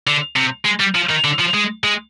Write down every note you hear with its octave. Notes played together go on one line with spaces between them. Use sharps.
D3
C3
G#3
G3
F3
D#3
D3
F3
G#3
G#3